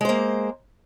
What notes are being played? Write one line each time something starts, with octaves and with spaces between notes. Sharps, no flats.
G#3 A#3 C5